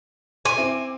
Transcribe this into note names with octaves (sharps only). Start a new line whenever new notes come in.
G#5 C6 D6
C4 E4